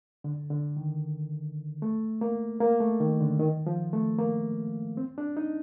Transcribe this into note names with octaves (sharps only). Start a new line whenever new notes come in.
D3
D3
D#3
A3
A#3
A#3
A3
D#3
D3
D#3
F3
A3
A#3
C4
D4
D#4